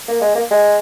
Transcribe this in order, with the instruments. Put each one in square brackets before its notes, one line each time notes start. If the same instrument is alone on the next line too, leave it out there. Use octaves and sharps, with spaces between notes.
[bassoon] A#3
G#3
A#3
G#3